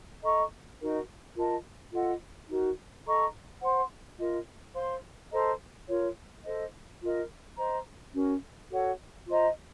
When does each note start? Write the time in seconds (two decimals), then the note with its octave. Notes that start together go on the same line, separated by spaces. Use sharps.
0.22 A4 D#5 A#5 C#6
0.80 D#4 F#4 A#4
1.36 F4 A#4 D#5 A5
1.93 F4 A4 D#5 F#5
2.48 D#4 F#4 A#4
3.06 A4 D#5 A#5 C#6
3.62 C5 F#5 C6
4.19 F4 A#4 D#5
4.74 C5 F5 C6
5.31 A4 C5 D#5 A#5
5.88 F4 A#4 C#5
6.44 A4 C5 D#5
7.00 F4 A#4 D#5
7.58 C5 D#5 A#5
8.14 C#4 F#4 A#4
8.71 F#4 A4 C#5 F#5
9.27 F4 C5 D#5 A#5